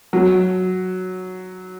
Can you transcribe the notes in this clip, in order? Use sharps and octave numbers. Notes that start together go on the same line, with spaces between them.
F#3